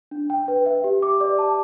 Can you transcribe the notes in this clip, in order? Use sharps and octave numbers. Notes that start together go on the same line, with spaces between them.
D4
G5
B4
E5
G4
D6
D5
A5